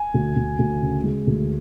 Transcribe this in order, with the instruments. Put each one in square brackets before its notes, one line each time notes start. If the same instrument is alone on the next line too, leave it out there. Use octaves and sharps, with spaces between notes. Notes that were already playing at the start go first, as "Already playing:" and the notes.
Already playing: [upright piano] G#5
D2
D2
D2
C#3
G#3
D2